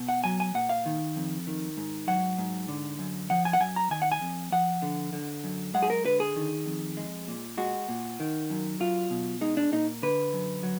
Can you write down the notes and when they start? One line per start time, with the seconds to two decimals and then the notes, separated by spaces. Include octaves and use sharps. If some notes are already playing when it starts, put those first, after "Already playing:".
Already playing: B2
0.09 F#5
0.24 F#3 G#5
0.40 G#5
0.54 A#2 F#5
0.69 F5
0.86 D#3
1.16 F2
1.47 D#3
1.77 G#2
2.08 F#3 F#5
2.38 G#2
2.68 D3
2.99 F#2
3.30 F3 F#5
3.45 G#5
3.53 F#5
3.60 F#2 G#5
3.76 A#5
3.91 D#3 G#5
4.02 F#5
4.12 G#5
4.21 F2
4.52 F3 F#5
4.82 D3
5.13 D3
5.44 F#2
5.74 G#3 F#5
5.82 G#4
5.90 A#4
6.05 D3 B4
6.20 G#4
6.36 D#3
6.66 F2
6.97 G#3
7.28 A#2
7.57 G#3 F#4
7.89 A#2
8.20 D#3
8.50 F#2
8.80 F#3 F4
9.10 B2
9.41 G#3 D#4
9.57 D4
9.72 A#2 D#4
10.02 D3 B4
10.33 F#2
10.63 F#3